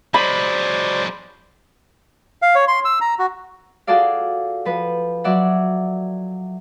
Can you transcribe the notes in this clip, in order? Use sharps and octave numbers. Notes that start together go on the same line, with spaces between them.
F#3 G#3 C5 D5 B5
F5
C#5
C6
E6
A#5
F#4
F4 F#4 G#4 A4 D5 F5
F3 B4
F#3 D5 E5 F#5